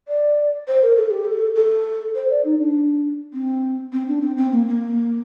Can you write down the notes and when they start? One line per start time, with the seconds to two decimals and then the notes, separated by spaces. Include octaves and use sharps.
0.08 D5
0.68 C5
0.82 A#4
0.97 A4
1.11 G4
1.25 A4
1.55 A4
2.15 C5
2.30 D5
2.45 D#4
2.59 D4
3.34 C4
3.93 C4
4.08 D4
4.22 C4
4.37 C4
4.52 A#3
4.68 A#3